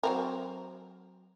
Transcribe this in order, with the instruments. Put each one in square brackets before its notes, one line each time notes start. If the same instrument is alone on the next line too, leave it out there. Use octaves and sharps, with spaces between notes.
[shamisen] F#3 C4 A#4